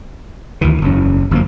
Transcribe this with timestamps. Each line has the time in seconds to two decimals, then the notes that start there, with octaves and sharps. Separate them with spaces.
0.61 D2 D#3 E3
0.82 F#1 E2 C#3 C#4
1.31 G1 F#2 F3 A#3